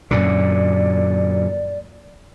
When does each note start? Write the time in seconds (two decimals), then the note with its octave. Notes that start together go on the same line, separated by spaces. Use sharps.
0.11 F#2 A#2 D3 D5